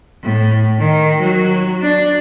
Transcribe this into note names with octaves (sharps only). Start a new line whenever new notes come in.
A2
D#3
F#3
D4